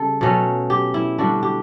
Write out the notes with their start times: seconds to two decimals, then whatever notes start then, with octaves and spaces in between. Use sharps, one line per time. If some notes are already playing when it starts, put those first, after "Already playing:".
Already playing: C#3 G3 A4
0.21 B2 F#3 A3 C#4
0.70 G4
0.94 E4
1.18 D3 G3 D4 F#4
1.43 G4